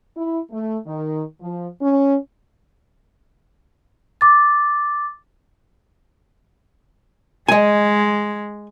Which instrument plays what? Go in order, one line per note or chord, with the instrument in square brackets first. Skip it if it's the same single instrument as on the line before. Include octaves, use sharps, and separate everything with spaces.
[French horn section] E4
A3
D#3
F3
C#4
[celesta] D6 A6
[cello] G#3 [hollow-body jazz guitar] D#5 G#5